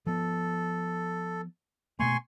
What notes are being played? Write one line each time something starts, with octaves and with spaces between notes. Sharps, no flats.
F3 B3 A4
B2 A3 A#3 G#5 C6 C#6